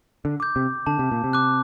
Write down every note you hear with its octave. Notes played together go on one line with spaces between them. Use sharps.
D3
D6 G6
C3
D3 A5
C3
A#2
C3
D6 F#6